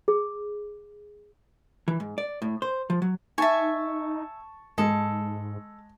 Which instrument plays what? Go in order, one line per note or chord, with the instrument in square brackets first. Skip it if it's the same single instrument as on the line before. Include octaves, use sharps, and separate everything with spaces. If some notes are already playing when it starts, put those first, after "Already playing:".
[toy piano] G#4
[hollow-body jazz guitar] E3
G#2
D5
A2
C5
F3
F#3
[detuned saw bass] D#4 [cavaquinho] E5 G#5 [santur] A5 C#6
[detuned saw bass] G#2 [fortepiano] G#3 [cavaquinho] A4